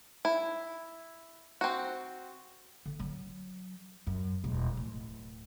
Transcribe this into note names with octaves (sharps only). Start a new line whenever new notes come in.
E4
C4 F#4
D3
F#3
F#2
E1
D1